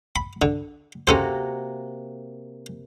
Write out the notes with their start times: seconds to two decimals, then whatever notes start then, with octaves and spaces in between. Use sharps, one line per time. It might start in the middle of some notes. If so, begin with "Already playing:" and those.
0.16 B5
0.42 D3
1.07 C3 A#3 C#4 F#4 A4 C5